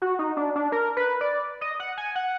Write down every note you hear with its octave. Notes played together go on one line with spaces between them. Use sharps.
F#4
D#4
D4
D4
A#4
B4
D5
D#5
F#5
G#5
F#5